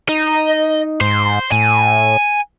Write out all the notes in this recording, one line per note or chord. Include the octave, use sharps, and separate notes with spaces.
D#4 D#5
G#2 C5
A2 G#5